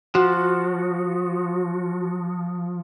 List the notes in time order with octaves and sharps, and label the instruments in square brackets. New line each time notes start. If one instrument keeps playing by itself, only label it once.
[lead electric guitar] F3 [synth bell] F#4